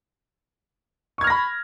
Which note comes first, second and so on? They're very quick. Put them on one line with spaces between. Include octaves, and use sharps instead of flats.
C#6 G#6 F6 A#6 B5